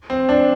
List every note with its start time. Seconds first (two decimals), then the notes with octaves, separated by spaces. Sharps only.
0.10 C4
0.29 D4